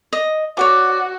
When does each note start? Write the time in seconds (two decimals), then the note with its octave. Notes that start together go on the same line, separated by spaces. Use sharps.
0.13 D#5
0.57 F#4 C#5 D5 D6